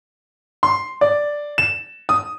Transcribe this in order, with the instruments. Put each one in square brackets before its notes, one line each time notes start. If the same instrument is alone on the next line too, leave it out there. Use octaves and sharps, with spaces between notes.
[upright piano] C6
D5
E7
D#6